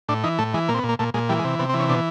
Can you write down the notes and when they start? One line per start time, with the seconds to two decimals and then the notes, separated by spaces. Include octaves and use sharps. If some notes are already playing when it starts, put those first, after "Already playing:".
0.09 A2 D4
0.24 E3 D#4
0.39 A2 A3
0.54 E3 G#3
0.69 A#2 A#3
0.74 C4
0.79 B3
0.84 A#2
0.89 A#3
0.99 A#2 A3
1.14 A#2 G#3
1.29 E3 G3
1.39 G#3
1.44 C3
1.59 C3 B3
1.69 C4
1.74 E3
1.80 C#4
1.89 B2 D4